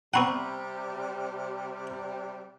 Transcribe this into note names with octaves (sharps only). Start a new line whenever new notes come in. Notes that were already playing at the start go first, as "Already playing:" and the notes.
C3 G3 B3 C4 F#5 A#5 B5 C#6